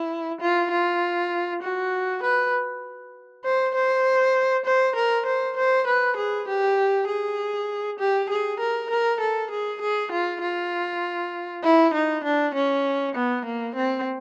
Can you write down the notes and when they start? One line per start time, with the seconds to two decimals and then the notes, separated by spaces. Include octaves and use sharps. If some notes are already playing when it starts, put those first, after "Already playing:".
Already playing: E4
0.41 F4
0.71 F4
1.62 F#4
2.23 B4
3.44 C5
3.75 C5
4.65 C5
4.95 A#4
5.26 C5
5.57 C5
5.87 B4
6.17 G#4
6.48 G4
7.08 G#4
7.99 G4
8.30 G#4
8.60 A#4
8.90 A#4
9.21 A4
9.51 G#4
9.81 G#4
10.12 F4
10.42 F4
11.63 E4
11.94 D#4
12.24 D4
12.54 C#4
13.15 B3
13.45 A#3
13.75 C4